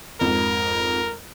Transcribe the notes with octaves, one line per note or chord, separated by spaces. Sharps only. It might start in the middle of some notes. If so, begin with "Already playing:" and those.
F2 G#2 A#4